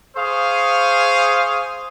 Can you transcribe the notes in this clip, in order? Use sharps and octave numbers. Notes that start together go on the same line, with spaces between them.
G#4 C5 F5 C#6 D#6